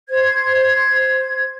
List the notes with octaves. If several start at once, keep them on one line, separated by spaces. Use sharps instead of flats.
C5 G#6